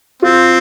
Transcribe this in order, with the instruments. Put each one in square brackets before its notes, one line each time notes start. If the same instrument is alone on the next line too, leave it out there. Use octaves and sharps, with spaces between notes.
[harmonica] C4 [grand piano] F4